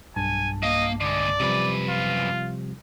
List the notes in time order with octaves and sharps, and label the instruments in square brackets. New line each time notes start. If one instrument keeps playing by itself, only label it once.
[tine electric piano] B1 G2 A5 [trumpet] G#5
[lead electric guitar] A#3 F5 [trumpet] D#5
[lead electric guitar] D3 G#3 [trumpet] D5
[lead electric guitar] F#2 B4 [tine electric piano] C3 F3 G3
[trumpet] F4